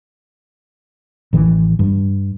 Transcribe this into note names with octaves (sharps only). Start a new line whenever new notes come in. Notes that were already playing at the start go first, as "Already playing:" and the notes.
A1 D#3 E3
G2